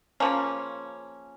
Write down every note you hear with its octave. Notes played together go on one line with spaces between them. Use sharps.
C#3 F3 A#3 C#4